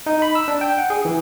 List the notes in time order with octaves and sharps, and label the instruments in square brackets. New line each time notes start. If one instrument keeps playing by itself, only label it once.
[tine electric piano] D#4
B5
E6
D4
G5
F#5
G#4
E3